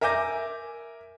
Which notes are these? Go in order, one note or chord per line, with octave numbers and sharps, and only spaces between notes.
A#4 E5 G#5 D6 G6 A#6